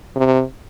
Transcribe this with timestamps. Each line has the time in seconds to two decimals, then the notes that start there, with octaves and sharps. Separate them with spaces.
0.16 C3